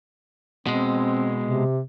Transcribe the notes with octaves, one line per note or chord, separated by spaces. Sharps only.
B2 G#3 C4
C3